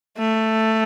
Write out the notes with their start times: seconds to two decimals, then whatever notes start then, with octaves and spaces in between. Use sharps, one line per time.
0.18 A3